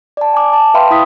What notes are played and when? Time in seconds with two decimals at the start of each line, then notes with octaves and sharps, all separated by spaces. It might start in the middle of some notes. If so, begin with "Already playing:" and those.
0.17 D5 A5
0.33 G#5 D6
0.53 A5
0.74 B4 E5 F5 G5 B5 C6
0.90 E4 B5 D#6 B6